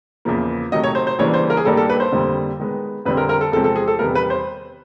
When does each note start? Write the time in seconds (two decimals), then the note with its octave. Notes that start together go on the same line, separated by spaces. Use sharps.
0.25 E2 C#3 F3 A#3
0.72 C3 D#3 F#3 A3 D#5
0.84 C#5
0.95 C5
1.07 C5
1.19 C#3 E3 G3 A#3 D4 C#5
1.34 C5
1.50 A#4
1.57 G#4
1.65 G2 D#3 G3 A#3 D4 A4
1.77 A4
1.90 B4
2.00 C5
2.12 F2 D3 G3 A#3
2.60 D#3 G#3 B3
3.05 F2 D3 G3 C4 B4
3.17 A#4
3.29 A#4
3.41 A4
3.52 E2 C3 F3 G#3 C4 A4
3.64 A4
3.76 G#4
3.88 A4
3.99 E2 C3 D#3 G3 B3 A#4
4.15 B4
4.30 C5